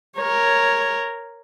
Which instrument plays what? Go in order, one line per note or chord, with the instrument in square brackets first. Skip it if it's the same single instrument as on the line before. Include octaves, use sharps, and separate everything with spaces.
[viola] A#4 C#5